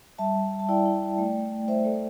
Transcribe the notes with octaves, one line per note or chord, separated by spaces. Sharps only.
G3 E5 A5
G3
G3
A5
E4 D5 G5
E4
E4
A3
A3
A3
A3 C5 E5
A3 A4 D5